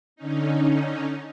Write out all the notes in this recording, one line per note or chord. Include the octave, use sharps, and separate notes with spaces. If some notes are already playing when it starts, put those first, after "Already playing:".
D3 C#4 D#4